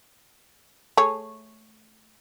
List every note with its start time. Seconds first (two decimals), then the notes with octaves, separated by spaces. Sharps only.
0.97 A3 G#4 C#5